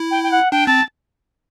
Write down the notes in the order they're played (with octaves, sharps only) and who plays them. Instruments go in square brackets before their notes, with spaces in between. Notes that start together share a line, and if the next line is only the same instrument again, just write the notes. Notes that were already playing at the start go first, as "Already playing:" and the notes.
Already playing: [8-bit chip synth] E4
[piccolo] G5
G5
F#5
[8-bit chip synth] D4 [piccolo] G5
[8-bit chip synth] C4 [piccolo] A5